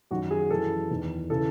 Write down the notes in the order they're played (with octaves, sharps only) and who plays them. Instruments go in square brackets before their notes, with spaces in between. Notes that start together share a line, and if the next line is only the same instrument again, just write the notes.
[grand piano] F#2 D#3 F#4
G#4
F#2 E3 A4
E2 D#3
C#3 E3 A4